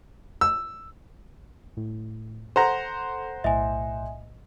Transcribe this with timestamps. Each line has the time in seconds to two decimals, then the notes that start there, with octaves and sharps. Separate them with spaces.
0.41 E6
1.77 A2
2.56 A4 C5 F#5 A#5
3.44 B1 A2 D#5 E5 G#5